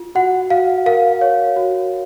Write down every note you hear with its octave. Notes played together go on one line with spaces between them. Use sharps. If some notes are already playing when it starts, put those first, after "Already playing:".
Already playing: F4
F#4 F#5
F#4 F5
A#4 F5
C#5
F#4